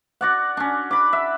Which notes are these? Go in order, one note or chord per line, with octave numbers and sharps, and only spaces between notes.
F#4 D5 F#5
C#4 D4
B5 D6
E5